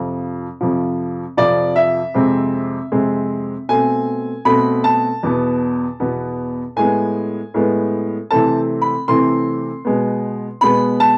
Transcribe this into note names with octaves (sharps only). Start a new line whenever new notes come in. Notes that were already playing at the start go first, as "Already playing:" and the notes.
Already playing: F2 C3 F3
F2 C3 F3
F2 C3 F3 D5
E5
F2 C3 G#3 C4
F2 C3 G#3 C4
B2 A3 C4 G#5
B2 A3 C4 B5
A5
E2 B2 B3
E2 B2 B3
A2 G#3 B3 G#5
A2 G#3 B3
C3 E3 A3 C4 A5
B5
C3 E3 A3 C4 C6
B2 G#3 B3
B2 G#3 B3 B5
A5